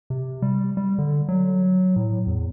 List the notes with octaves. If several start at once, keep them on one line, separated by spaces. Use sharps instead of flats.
C3
G3
G3
D3
F#3
A2
E2